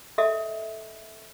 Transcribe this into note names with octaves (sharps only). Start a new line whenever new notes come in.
A4 D#5 E5